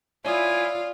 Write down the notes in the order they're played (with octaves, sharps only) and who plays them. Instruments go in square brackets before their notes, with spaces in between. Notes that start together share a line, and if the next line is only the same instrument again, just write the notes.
[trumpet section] E4 G#5 [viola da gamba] F4 [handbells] C#5 D5 D#6